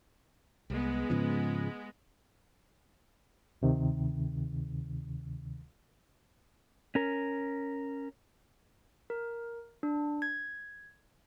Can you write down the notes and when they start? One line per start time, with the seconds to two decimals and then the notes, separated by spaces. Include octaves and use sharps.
0.70 C2 G#3 B3
1.10 G#2 C#3 F3
3.62 D2 C3 D#3
6.95 C#4 A#4
9.10 A#4
9.83 D4
10.22 G#6